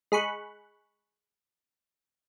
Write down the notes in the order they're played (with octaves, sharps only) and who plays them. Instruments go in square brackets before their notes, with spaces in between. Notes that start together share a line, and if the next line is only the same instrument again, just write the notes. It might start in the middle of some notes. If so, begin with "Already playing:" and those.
[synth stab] G#3 G#4 B5 C#6 F#6